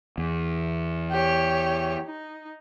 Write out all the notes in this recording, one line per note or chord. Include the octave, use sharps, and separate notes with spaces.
E2
G4 C#5
D#4